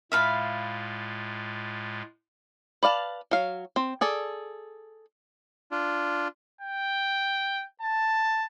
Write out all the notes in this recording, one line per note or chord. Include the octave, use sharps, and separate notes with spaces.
A2 G#3 F4 E5 F5 B5
B4 D5 F5 A5
F#3 F5
C4
G#4 A4 D5
D4 F4
G5
A5